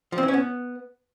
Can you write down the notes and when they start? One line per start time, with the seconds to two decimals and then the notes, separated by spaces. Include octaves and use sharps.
0.12 F3
0.18 C4
0.23 E3
0.28 C#4
0.34 B3